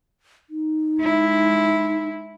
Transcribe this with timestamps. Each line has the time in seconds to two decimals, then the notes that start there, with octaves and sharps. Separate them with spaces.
0.50 D#4
1.00 G#3 E4